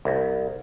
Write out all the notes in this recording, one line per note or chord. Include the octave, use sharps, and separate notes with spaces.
C2